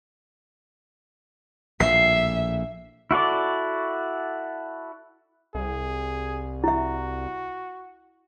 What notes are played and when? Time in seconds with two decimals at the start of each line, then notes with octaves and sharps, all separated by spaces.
1.80 A#1 A2 E5 C7
3.11 E4 F#4 A4 D5
5.55 C2 G#4
6.64 E4 F#4 E5